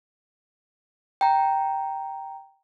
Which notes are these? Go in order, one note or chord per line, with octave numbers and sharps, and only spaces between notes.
G5 A#5